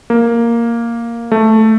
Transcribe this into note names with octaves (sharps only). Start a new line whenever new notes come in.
A#3
A3